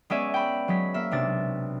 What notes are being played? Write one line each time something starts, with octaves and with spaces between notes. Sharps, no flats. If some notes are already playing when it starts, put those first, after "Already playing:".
G#3 B3 C#4 D5 E5 G#5
G5 B5
F#3 G#3 B6
A#3 E5
B1 C3 D4 A6